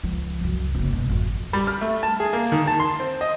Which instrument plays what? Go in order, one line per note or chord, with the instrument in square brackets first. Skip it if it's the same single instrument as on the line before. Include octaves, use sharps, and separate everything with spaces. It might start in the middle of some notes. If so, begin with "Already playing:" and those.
[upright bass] C#2 F3
C2 F#2
F#1 C#3
G#1 B2
G#1 F2
[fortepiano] G3
F6
A3
A5
G#4
A#3
D#3
A5
C6
C4
D#5